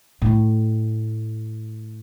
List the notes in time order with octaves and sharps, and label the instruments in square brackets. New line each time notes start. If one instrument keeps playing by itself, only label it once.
[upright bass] A2 A3